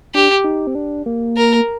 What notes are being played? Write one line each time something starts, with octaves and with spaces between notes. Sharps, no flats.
D4 G4
D#4
C4
D4
A#3
A#4